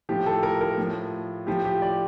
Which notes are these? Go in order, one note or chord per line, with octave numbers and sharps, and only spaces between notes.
A2 F3 G4
A4
A#4
A#4
A2 F3
A2 F3 G4
G4
D5